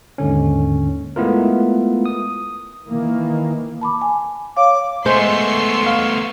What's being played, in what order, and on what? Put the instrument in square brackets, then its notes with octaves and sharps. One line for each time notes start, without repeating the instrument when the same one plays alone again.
[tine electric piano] D#2 G#2 D3 C#4
G#3 A3 B3 E4 F4 A#4
D#6
[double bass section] D#3 E3 A#3
[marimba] A5 B5 D6
G#5
[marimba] C#5 F5 [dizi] D6
[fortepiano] G#3 [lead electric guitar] A3 B3 [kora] C5 [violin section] C6 C#6 E6
[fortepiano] F5